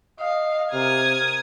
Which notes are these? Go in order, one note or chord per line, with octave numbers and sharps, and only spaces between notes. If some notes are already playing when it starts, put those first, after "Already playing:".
D#5 F5
C3 A#4 D#6 F6 G#6